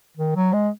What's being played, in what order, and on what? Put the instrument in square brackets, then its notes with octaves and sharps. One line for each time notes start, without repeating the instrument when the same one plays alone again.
[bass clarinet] D#3
F#3
G#3